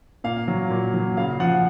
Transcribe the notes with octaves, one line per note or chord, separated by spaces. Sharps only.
A#2 F5
F#3
A#2
F#3
C#3 F5
F3 F#5